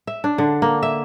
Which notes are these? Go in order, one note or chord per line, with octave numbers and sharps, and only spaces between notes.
E5
D4
D3
A#3
E5